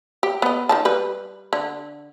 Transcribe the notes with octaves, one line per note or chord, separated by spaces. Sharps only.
G4
B3 D#5
D#3 F3 A5
G3 B4
D3